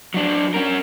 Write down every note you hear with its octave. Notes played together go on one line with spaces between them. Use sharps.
F#3 D4
C#4 A#4